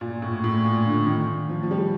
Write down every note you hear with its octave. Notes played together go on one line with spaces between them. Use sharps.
A#2
A2
A2
A#2
D3
D#3
F3
F3
G3